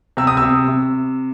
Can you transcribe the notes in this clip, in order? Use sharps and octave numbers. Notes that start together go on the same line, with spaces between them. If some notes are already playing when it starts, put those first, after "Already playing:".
C3 E6
D#6
C3 E6
C3